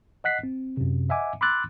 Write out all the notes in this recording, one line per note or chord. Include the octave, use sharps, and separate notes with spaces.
D#5 F#5 F#6 B6 C7
C4
F#2 C3
D#5 E5 F#5 G#5 D6
B5 C6 D6 E6 F#6 A6